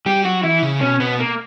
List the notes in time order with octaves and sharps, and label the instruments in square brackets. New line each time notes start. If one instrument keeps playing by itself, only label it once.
[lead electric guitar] G3 [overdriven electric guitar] G4
[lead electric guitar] F#3 [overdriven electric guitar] F#4
[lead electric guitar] E3 [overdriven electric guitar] E4
[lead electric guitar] C#3
[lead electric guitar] B2 [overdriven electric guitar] C#4
[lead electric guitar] B2 [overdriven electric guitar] B3
[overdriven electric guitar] A#3